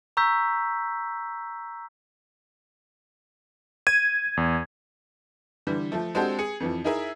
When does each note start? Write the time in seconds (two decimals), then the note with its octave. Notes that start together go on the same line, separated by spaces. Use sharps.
0.17 A#5 C#6 E6 G6 B6
3.87 G#6 D#7
4.37 E2
5.67 D3 E3 G3
5.92 F3 A3
6.15 G#3 C4 D4 F#4 G4 A4
6.39 G#4 C#7
6.60 F2 E3 F3
6.84 D#4 E4 G#4 A#4 E5